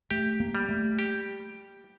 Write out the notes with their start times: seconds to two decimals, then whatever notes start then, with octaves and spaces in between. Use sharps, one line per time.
0.10 A3 G4
0.40 A#3
0.55 G3
0.69 A3
0.99 G4